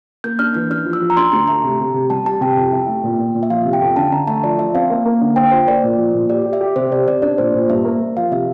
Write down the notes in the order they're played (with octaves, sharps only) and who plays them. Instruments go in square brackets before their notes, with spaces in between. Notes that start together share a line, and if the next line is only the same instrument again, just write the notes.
[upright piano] A#3 [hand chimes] G6
[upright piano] D4 [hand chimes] F6
[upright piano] E3 [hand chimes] G6
[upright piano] D4 [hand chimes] F6
[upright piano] F3
[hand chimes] E6
[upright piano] F3
[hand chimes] A#5
[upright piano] D4 [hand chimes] C6
[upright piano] D2 [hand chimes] A#5
[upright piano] A3 [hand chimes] A#5
[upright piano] C3
C3
C3
[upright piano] G3 [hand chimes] A5
[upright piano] G3 [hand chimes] A5
[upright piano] C3 [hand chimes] G5
[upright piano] F2
E4
A3
A#2
A#2
A#2
[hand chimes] E5
[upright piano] F3 [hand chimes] F5
[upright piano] C3
[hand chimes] G5
[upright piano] F2
[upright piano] D3 [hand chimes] A5
[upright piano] D3 [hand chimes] A#5
[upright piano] A3 [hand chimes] A5
[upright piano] F3 [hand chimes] D5
[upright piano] F3 [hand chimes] E5
[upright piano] C4 [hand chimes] F5
[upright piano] A#3
A#3
D3
[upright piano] C5 [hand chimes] G5
[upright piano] F4 [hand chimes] C5
[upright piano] A#3 [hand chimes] D5
[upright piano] A#2
F3
A#2
[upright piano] G4 [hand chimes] D5
[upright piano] G4
[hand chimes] E5
[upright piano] G4
[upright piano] C3 [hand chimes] C5
[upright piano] C3 [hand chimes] D5
[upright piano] C3 [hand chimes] D5
[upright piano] D4 [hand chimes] D5
[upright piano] A#2 [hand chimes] C5
[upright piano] A#2
[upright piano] G2 [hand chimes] E5
[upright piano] A#3
A#3
[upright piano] F3 [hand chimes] F5
[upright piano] C3 [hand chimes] E5